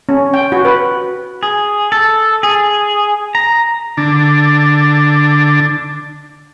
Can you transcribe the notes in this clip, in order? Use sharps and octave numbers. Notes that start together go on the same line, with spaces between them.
C#4
G5
F#4
B4
G#4
A4
G#4
A#5
D3 D4